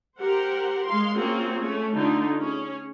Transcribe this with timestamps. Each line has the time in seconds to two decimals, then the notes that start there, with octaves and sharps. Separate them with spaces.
0.19 G4 A#4 C5 F#5
0.84 G#3 F5 C6
1.16 A#3 C4 C#4 F4 F#4 G#4
1.61 A3 C#4
1.95 D3 A3 D#4 F4
2.39 C#4 G#4